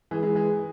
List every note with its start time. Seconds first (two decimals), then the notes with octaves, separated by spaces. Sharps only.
0.11 E3 G#3
0.23 E3 G#3
0.35 E3 G#3